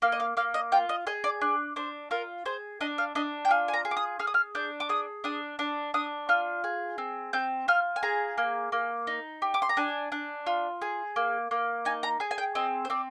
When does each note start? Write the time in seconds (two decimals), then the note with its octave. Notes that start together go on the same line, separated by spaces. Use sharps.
0.02 A#3 F5
0.12 D#5
0.20 F5
0.37 A#3 F5
0.54 D#5
0.72 F4 G5
0.89 D#5
1.07 G#4 D#5
1.24 D5
1.41 D4
1.76 D4 C5
2.11 F4 A#4
2.46 G#4 C5
2.81 D4 D#5
2.98 F5
3.15 D4 D#5
3.45 G5
3.51 F4 G#5
3.68 G#5
3.74 A#5
3.85 G#4
3.91 D6
3.97 D#6
4.19 G#4 F6
4.27 D#6
4.34 F6
4.55 D4 G6
4.80 D6
4.89 G#4 D#6
5.24 D4 D#6
5.59 D4
5.94 D4 D#6
6.29 F4 F6
6.64 G#4
6.98 C4
7.33 C4 G6
7.68 F4 F6
7.96 G#5
8.03 G#4 A#5
8.38 A#3
8.72 A#3
9.07 D#4
9.42 G4
9.54 D6
9.62 C6
9.69 A#5
9.77 D4 G#5
10.12 D4
10.46 F4
10.82 G#4
11.16 A#3
11.51 A#3
11.85 D#4 G#5
12.03 A#5
12.20 G#4 G#5
12.31 G#5
12.38 G5
12.55 C4 D#5
12.85 C5
12.90 C4 D5